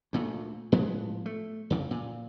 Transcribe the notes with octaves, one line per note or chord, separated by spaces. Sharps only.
D2 A#2 A3
A2 F3 G#3 B3
A3
F2 C#3
A#2